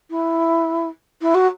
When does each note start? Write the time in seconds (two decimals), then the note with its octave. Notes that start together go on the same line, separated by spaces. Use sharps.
0.10 E4
1.22 E4
1.35 F#4